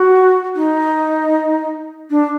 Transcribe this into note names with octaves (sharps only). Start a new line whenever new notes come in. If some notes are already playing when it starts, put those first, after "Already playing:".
Already playing: F#4
D#4
D4